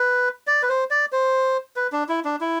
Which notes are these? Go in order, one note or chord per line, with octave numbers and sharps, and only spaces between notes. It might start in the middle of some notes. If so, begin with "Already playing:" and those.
Already playing: B4
D5
B4
C5
D5
C5
B4
D4
E4
D4
E4